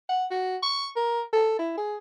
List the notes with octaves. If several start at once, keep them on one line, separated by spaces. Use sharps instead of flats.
F#5
F#4
C#6
A#4
A4
E4
G#4